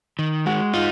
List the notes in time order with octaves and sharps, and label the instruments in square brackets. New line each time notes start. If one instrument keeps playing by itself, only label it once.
[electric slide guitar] D#3
[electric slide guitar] G#3 [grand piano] F#4
[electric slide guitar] D#4 [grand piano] F4